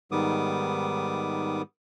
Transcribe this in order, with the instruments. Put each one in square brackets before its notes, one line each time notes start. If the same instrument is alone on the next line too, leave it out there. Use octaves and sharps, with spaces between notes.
[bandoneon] G#2 D#3 G3 B3 D6 D#6